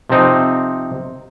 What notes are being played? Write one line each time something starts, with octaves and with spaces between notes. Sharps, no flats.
C3 F3 C4 D#4